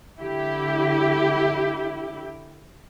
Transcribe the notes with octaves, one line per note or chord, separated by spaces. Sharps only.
D3 E4 G4